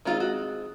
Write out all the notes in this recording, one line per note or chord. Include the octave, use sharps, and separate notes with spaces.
D#3 G#3 C4 D#4 F4
F#4